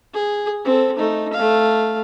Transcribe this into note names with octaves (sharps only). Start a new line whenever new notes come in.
G#4
C4 A4
A3 D#4
A3 F5